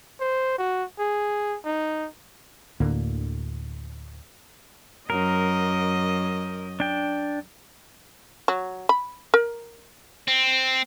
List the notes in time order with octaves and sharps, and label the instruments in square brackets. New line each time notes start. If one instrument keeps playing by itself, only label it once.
[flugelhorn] C5
F#4
G#4
D#4
[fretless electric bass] D2 A2 D3 A#3
[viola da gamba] F#2 D#5 [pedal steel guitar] A#4
[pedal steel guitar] D4 G5
[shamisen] F#3
B5
A#4
[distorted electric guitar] C4